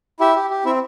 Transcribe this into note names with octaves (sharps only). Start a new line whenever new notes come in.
E4 G4 E5
G4
G4
C4 E4 E5